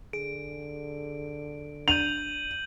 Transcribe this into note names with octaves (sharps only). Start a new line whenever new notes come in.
D3 G#4 D7
D4 G6 D#7 F7 F#7